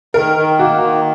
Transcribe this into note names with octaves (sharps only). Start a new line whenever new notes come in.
D#3 A#4
D#3
A#3 F#4
D#3